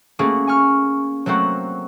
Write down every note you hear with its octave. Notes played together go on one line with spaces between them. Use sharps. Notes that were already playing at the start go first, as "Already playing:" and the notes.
A3 A#3 C#4 F#4 G#4
G#5 C#6 F6
F#3 A3 A#3 C4 F#4